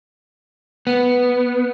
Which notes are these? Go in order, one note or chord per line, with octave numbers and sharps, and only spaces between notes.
B3